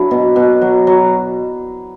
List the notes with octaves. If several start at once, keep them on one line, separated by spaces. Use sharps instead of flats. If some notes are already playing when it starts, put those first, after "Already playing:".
Already playing: F#3 D4 E4
B2
B2
F#3
F#3